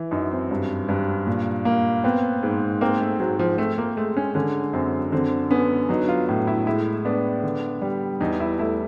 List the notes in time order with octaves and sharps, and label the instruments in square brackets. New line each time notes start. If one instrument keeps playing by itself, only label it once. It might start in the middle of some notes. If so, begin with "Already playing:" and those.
Already playing: [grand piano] E3
[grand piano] F#2 [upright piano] D#4
[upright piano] C4
[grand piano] G2
G2
A#2
A#3
[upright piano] B3 [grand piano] C4
[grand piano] G#2
[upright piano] A#3 [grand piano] C4
[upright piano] A3
[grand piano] G#2 [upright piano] F#3
[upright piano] F3
[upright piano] A3 [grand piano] C4
[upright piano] A#3
[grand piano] G#3 [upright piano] A3
[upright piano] C#4
[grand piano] D3 [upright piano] C#4
[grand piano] F#2 [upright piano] C4
[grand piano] D3 [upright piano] C4
[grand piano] B3 [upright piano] C#4
[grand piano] F#3 [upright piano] D#4
[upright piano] F4
[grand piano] A2
[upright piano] E4
[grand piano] G#3 [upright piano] E4
[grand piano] B3 [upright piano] D4
[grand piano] D3
G3
[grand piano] E2 [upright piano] D#4
[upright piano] E4
[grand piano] A3 [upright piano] E4